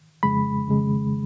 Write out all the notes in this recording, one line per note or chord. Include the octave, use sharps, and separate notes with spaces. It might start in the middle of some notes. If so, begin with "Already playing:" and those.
F2 C#3 G#3 B5
F2 C#3 G#3